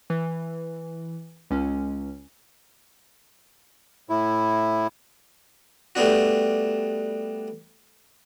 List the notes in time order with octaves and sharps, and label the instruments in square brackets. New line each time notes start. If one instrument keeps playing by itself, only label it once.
[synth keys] E3
C#2 C#4
[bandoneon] A2 E4
[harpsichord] G3 A3 B3 D4 F#4